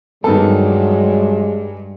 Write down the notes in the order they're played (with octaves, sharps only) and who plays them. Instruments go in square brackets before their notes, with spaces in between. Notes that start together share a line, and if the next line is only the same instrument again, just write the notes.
[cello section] G2 [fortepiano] D#3 B3 A4 [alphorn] F#3 [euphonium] G#3